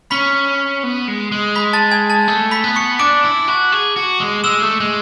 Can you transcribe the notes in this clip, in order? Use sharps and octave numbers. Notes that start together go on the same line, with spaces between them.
C#4 B5 B6
B3
G#3
G#3
B5 B6
A5 A6
G#5 G#6
A5 A6
A3
B5 B6
B3
C#6 C#7
D4 D6 D7
E4
F#4
G#4
F#4
G#3
G#3 E6 E7
A3
G#3